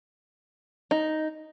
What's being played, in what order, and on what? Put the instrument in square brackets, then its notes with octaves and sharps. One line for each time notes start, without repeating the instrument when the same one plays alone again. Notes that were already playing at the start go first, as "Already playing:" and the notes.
[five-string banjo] D#4